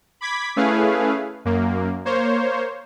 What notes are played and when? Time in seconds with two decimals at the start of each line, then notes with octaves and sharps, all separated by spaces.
0.21 B5 D6 G#6 B6
0.56 A3 C#4 E4 G#4 B4 F5
1.45 F#2 A#3
2.05 A#3 C5 C#5